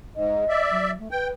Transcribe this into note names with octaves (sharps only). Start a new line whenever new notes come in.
G#2 D#5
D5 E5
F#3
A3
B4 G5